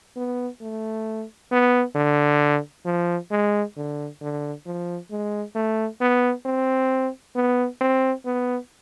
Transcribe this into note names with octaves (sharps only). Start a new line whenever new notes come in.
B3
A3
B3
D3
F3
G#3
D3
D3
F3
G#3
A3
B3
C4
B3
C4
B3